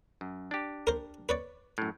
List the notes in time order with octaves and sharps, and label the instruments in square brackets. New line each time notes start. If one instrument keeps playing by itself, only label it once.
[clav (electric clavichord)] F#2
D4 G4
[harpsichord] A#4 C5
B4 C#5 D5
[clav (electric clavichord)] F#2 A2